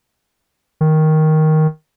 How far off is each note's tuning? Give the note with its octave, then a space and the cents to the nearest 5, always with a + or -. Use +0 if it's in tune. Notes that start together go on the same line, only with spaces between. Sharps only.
D#3 +5